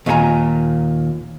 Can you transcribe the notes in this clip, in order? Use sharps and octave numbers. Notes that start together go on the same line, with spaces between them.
D#2 A#2 C#4 G#4 G#5 A#5